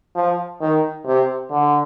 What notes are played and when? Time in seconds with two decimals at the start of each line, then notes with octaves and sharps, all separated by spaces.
0.16 F3
0.61 D#3
1.06 C3
1.51 D3